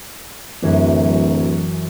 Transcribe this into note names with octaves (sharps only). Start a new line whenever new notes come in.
D1 F#2 E3